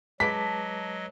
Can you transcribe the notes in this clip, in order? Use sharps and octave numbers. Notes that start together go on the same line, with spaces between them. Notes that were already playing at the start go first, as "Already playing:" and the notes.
F#3 G#3 B4 D#5 A5 D6 B6